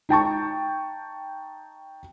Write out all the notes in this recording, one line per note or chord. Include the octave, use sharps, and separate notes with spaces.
D#4 G5 A5 C#6